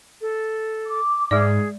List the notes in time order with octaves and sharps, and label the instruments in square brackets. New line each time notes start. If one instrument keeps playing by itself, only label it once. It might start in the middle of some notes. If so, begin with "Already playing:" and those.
[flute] A4
[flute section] D6
[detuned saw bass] G#2 [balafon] G#3 D5 [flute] G#4